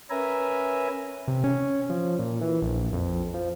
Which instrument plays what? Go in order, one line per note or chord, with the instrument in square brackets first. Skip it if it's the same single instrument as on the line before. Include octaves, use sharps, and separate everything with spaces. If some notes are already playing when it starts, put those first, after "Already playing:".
[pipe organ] C#4 A#4 B4 E5 G#5 A#5
[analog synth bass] C3
C#4
F3
A#2
E3
A#1
F2
F3